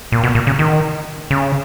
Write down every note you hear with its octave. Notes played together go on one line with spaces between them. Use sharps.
A#2
B2
A#2
C#3
D#3
C#3